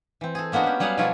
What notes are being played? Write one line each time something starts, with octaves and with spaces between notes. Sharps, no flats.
E3 C4
G#4 A4
G#3 A#3 B3 D4 F#4
C#4 G4
F#3 G3 G#4 B4 F5 F#5
B2 F3 A#3 E4 F4 C#5